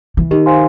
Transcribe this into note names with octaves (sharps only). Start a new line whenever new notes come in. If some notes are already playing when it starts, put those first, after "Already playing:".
E3
D#3 G4
C5 F5 G#5 C6